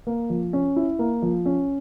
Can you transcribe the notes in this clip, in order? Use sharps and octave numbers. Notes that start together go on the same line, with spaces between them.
A#3
F3
C#4
E4
A#3
F3
C#4